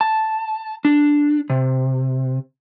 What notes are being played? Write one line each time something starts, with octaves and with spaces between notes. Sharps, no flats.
A5
D4
C3